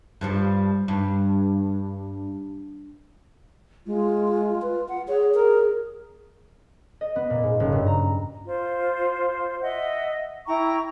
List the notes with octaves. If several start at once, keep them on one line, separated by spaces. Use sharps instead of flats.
G2 F3 G3
G2
G#3 F4
B4
F#5
G#4 C#5
A#4
D#5
B3
A#2
G#2
F#1
G2
A#5
F4 C5
D#5 E5 F#5
E4 G5 A#5 C#6